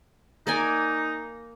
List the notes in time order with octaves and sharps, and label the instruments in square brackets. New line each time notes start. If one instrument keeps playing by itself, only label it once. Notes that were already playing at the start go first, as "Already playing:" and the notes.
[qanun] A#3 D5 G#5 [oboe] D#4